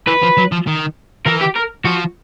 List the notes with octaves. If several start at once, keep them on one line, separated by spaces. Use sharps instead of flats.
E3 B4
F3
F#3
F3
D#3
E3 A#4
G4
A#4
F3 F#4